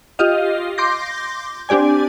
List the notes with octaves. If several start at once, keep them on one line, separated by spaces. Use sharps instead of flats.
F4 G4 D#5 F5
C6 D6 G6 A#6
C4 D4 G4 D5 G#5